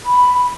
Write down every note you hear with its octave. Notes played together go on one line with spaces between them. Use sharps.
B5